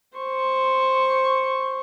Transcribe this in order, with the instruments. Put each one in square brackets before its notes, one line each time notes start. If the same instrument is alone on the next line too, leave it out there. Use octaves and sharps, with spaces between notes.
[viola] C5 C#6